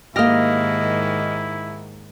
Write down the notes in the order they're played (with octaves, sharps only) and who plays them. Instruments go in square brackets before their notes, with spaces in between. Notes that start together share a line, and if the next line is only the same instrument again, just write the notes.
[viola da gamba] G#2 D#3 [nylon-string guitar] A#3 G4 [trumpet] E4 [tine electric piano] D#5 F6 A#6